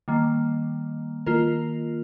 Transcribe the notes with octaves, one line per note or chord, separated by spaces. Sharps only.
D#3 G3 A#3
D#3 A#3 F4 A#4